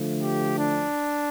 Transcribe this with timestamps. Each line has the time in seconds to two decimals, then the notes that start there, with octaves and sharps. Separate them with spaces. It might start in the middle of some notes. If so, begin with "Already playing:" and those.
Already playing: D3 F3 A3
0.22 G4
0.59 D4